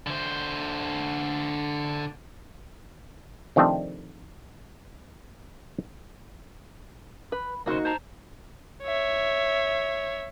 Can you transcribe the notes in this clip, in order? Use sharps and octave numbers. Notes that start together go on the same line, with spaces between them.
D3 C5
C3 D#3 F3 A3 C4 D4
B4 B5
B1 C#3 A#3 D#4 F#4 C5
C5 A5 A#5
C#5 E5